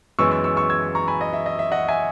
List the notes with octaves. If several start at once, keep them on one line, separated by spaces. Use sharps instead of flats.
F#2 E3 G#3 B3 C#6 E6
C#6 E6
C#6 E6
C#6 E6
E6 G#6
A#5 C#6
G#5 B5
D#5
E5
D#5
E5
D#5 F#5
E5 G#5